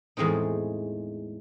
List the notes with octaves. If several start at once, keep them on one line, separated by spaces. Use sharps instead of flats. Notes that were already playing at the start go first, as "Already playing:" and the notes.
E2 A2 G#3 C4 D#4